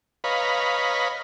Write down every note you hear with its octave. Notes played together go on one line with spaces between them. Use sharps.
B4 C#5 D#5 F5 A#5 B5